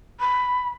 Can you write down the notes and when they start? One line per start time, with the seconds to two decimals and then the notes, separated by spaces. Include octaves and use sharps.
0.20 B5